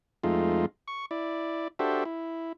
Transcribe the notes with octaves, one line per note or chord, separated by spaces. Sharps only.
F2 G#3 A3 D#4 F4
C#6
E4 D5
D4 F#4 G4 A4 C5 E5
E4